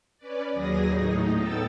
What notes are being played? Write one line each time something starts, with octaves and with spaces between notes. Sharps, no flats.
C#4 B4 D5
D#2 F#3 G#4 D#6 A#6
A2 D#4
B3 A4 G5 E6 A6